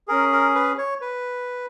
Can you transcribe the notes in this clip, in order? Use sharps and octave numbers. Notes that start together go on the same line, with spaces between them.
C#4 G#4 A#4
A#4
B4
C#5
B4